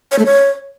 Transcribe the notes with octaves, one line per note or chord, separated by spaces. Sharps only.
C#5
A3
C#5